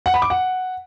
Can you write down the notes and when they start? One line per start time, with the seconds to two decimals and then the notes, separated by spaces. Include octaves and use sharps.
0.06 F#5
0.14 B5
0.22 D6
0.30 F#5